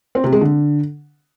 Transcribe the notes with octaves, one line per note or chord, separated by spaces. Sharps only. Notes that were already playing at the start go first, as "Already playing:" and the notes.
C4
C3
G#3
D3